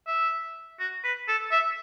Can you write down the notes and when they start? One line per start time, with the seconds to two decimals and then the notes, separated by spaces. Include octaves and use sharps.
0.07 E5
0.79 F#4
1.04 B4
1.28 A4
1.51 E5